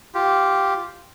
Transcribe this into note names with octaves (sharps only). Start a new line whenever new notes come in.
F4 G4